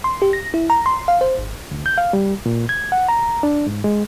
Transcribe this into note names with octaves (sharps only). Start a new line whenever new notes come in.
C6
G4
A#6
E4
A#5
C6
F5
C5
G#1
D2
G6
F5
G3
A#2
G#6
F#5
A#5
D4
G#2
G#3